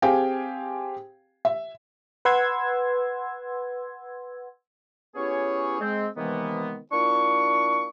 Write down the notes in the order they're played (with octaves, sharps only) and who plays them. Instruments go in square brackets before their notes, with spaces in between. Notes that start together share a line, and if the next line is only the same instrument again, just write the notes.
[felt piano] C4 G4 G#4 F5 G5 G#5
E5
[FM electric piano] B4 F#5 C6 E6 G#6
[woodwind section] B3 C#4 E4 G4 G#4 C#5
G#3 C4
C3 D#3 E3 G#3 A#3 B3
A#3 D4 E4 F4 C#6